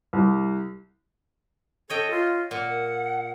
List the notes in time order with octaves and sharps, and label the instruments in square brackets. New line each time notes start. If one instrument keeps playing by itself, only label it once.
[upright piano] C2
[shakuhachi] A4 [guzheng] C#5 D#5 G5
[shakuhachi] F4
[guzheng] A#2 [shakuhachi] F#5